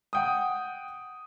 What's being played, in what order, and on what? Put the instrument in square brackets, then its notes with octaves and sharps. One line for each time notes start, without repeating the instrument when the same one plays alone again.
[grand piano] F#5 G5 D#6